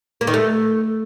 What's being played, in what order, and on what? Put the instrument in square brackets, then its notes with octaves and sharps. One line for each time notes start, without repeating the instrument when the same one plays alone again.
[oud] A#3
D#3
A3